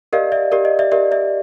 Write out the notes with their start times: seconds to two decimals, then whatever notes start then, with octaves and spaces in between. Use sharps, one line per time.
0.13 G4 A#4 D5 D#5 F5
0.32 D5 E5
0.52 G4 A#4 D5
0.65 D#5
0.79 D5 E5
0.92 G4 A#4 D5 E5
1.12 D5 E5